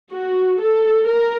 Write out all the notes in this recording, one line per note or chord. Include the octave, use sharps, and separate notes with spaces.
F#4
A4
A#4